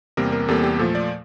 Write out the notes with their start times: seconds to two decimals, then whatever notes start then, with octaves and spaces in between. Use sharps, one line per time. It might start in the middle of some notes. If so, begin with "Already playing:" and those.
0.17 E2 C3 G3 A#3 A#4
0.32 A#4
0.48 E2 C3 G3 A#3 A4
0.64 G4
0.79 A#2 F3 A3 A4
0.95 D5